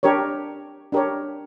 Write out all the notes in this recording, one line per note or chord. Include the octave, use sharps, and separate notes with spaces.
D4 G4 A#4 C#5
D4 G4 A#4 C#5